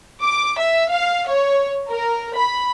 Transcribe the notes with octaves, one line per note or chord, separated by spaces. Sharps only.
D6
E5
F5
C#5
A#4
B5